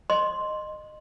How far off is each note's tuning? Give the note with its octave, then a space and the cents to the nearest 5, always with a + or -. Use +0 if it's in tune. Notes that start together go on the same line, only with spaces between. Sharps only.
D#5 -20 C6 +5